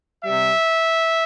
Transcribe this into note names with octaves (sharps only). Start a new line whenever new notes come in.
C3 G3 E5